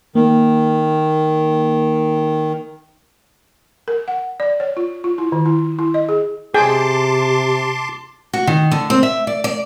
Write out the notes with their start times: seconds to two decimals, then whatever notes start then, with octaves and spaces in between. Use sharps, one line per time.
0.15 D#3 A#3
3.88 A#4
4.08 F#5
4.40 D5
4.60 C#5
4.77 F4
5.04 F4
5.18 E4
5.32 D#3
5.46 E4
5.79 E4
5.94 D#5
6.09 G#4
6.54 C3 G#4 G5 A5 C6 D6
8.33 F#4
8.47 D#3
8.72 D3
8.90 C4
9.03 E5
9.27 D5
9.44 D5